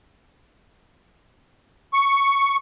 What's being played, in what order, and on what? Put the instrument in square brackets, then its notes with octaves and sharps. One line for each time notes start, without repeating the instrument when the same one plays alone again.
[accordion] C#6